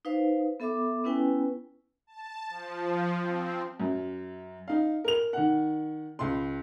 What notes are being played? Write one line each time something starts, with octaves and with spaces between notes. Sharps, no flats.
D#4 B4 C5 F5
B3 A4 E5 B5 D6
B3 C#4 E4 B4 G5 G#5
A5
F3
C4
F#2
D#4 F5
A#4 F7
D#3 F#5
C#2 C6